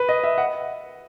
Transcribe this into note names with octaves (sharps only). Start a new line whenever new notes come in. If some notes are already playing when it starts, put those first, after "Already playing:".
Already playing: B4
D#5
E5
F#5